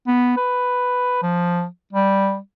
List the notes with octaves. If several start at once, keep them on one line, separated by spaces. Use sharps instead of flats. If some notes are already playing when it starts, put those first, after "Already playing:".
B3
B4
F3
G3